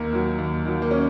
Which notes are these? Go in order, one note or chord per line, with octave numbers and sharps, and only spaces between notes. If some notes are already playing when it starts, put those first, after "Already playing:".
Already playing: D#2 A#3
D#3 F#3
D#2
D#3 F#3
A#3
C#4